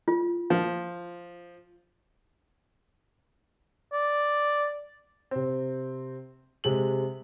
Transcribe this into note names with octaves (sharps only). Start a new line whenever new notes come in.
F4
F3
D5
C3 C4
C3 G#3 F#7